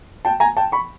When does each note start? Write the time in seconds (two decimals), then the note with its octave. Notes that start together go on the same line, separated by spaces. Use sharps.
0.25 G5 A5
0.40 G#5 A#5
0.57 G5 A5
0.72 B5 C#6